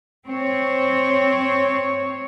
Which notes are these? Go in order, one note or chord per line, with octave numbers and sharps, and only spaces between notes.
C4 C#5